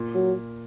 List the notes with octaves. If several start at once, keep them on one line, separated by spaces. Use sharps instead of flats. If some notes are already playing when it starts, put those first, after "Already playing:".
Already playing: A#2
F#3